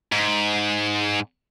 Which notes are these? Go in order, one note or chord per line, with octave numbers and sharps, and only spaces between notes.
G#2